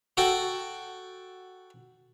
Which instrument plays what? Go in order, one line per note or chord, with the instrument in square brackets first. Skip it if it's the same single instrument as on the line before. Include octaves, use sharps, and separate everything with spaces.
[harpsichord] F#4 A4 G5